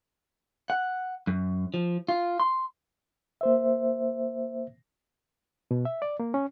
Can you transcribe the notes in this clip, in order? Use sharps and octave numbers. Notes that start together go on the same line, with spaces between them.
F#5
F#2
F3
F4
C6
A#3 C5 E5
B2
E5
D5
A#3
C#4